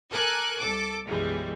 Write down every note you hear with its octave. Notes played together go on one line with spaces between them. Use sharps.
A4 A#4 G#5 D6 F#6
C2 A4 D6
B1 F#2 E3 G3 G#3